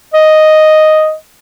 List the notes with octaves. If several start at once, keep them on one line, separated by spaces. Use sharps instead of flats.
D#5